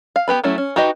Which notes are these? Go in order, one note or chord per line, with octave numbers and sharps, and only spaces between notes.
F5
B3 G4 B4 B5
F#3 A3 C#4 E4
C#4
D#4 F#4 G4 B4 D#5